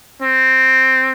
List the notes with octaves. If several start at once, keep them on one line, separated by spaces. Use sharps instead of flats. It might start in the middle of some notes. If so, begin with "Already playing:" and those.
C4